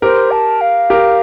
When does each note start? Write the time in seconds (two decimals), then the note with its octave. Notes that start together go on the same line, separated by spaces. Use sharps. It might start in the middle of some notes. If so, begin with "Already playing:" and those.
0.02 G4 A#4 C5
0.31 A5
0.61 F5
0.90 G4 A#4